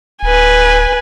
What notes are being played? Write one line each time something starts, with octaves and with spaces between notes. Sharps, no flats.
D1 B4 G#5